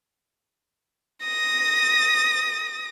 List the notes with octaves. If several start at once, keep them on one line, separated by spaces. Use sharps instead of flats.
D#6 A#6